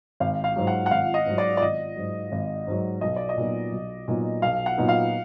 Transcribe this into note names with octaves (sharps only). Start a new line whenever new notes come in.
G#1 F5
F5
G#2 F#3
F#5
F#5
G#1 F5
D#5
G#2 F#3
D5
D5
G#1 D#5
G#2 F#3
G#1
G#2 F#3
B1 D#5
D5
D#5
A#2 F#3 B3 D#4
B1
A#2 F#3 B3 D#4
B1 F5
F#5
A#2 F#3 B3 D#4
F5